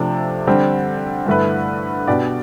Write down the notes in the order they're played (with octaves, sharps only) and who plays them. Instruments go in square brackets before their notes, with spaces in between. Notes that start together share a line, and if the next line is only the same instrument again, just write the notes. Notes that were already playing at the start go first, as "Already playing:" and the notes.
Already playing: [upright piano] C3 F3 A3 D4
D3 G3 C4
G2 D3 A3 E4 B4
B2 B3 D4 G4 D5